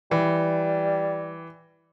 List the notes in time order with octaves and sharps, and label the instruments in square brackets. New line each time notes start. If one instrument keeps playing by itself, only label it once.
[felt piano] E3 [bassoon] G3